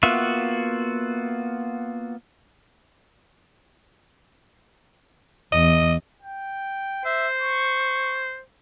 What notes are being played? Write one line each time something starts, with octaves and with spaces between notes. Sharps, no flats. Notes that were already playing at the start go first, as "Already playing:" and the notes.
A#3 B3 F4 F#4 E5
E2 D#5
G5
C5 E5
C#6